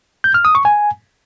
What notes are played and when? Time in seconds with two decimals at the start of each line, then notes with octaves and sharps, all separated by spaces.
0.24 G6
0.34 F6
0.45 D#6
0.55 C#6
0.65 G#5